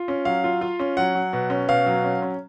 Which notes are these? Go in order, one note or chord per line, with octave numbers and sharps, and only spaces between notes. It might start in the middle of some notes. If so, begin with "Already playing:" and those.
Already playing: F4
C#4
F#3 F5
F4
F4
C#4
F#3 F#5
F#3
B2
C#4
B2 F5
F#3
C#4
C#4